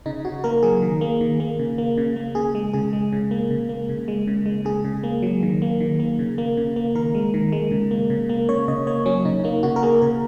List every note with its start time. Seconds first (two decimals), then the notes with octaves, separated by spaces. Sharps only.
0.06 C#3 D#4
0.25 C#3 F#4
0.44 A#3 A#4
0.63 F#3 G#4
0.82 D#3
1.01 A#3
1.21 D#3
1.40 A#3
1.59 C#3
1.78 A#3
1.97 C#3
2.16 A#3
2.35 C#3 G#4
2.55 G#3
2.73 C#3 G#4
2.93 G#3
3.13 C#3
3.31 A#3
3.51 C#3
3.69 A#3
3.89 C#3
4.08 G#3
4.27 C#3
4.46 G#3
4.65 C#3 G#4
4.85 C#3
5.03 A#3
5.22 F#3
5.43 D#3
5.62 A#3
5.80 D#3
6.00 A#3
6.19 C#3
6.38 A#3
6.57 C#3
6.76 A#3
6.95 D#3 A#4
7.15 G#3
7.34 D#3
7.52 G#3
7.71 C#3
7.91 A#3
8.10 C#3
8.29 A#3
8.49 C#3 C#5
8.68 C#3 D#5
8.87 A#3 C#5
9.05 F#3 C#4
9.25 C#3 D#4
9.44 A#3 D#4
9.63 C#3 F#4
9.76 A#4
9.83 A#3 G#4
10.02 C#3 A#4